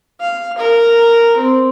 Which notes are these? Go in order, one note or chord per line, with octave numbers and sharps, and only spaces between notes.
F5
A#4
C4